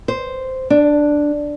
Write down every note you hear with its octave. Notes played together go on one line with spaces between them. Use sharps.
C5
D4